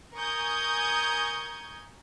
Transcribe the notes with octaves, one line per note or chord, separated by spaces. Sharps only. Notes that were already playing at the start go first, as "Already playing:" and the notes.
A#4 G#5 C#6 D#6 G6 G#6